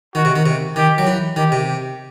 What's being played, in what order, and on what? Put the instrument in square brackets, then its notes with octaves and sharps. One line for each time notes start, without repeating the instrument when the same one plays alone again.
[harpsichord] D#3 [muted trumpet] F#4
[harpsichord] C3
D#3
C3
[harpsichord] D#3 [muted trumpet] G4
[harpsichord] F#3
E3
[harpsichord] D#3 [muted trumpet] G4
[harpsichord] C3